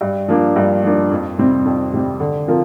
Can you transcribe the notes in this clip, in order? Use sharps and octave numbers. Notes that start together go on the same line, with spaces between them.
G2
F3 A#3 D4
G2
F3 A#3 D4
F2
C3 G3 C4
F2
C3 G3 C4
D3
F3 C4 F4 A#4